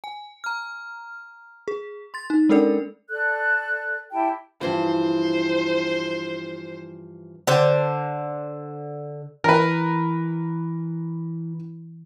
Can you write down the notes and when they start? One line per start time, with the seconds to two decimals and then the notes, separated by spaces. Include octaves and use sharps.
0.04 G#5
0.44 A#5 F6
1.68 G#4
2.14 C6 A6
2.30 D#4
2.49 G#3 C#4 D4 A4 A#4 D5
3.10 A4 D5 F#6
4.12 E4 G4 G5 A5
4.61 G2 E3 F3 C5
7.47 D3 C5
9.44 E3 A#4 B4